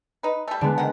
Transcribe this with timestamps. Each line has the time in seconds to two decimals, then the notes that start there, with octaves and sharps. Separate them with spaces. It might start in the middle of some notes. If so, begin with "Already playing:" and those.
0.23 D#4 B4
0.48 G3 A3
0.61 D3 G#3 B3 D4
0.78 D#3 F#5